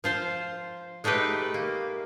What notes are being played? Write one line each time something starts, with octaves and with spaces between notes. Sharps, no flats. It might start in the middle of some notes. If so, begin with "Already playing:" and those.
F3 F4 C5
G#3 A3 D#4 G4 B4
A#3